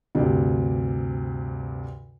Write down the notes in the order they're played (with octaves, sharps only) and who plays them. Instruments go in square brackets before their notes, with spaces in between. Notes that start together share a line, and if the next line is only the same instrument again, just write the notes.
[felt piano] D2 G2 C3